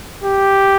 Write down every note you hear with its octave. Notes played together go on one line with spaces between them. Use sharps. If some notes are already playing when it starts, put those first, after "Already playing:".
G4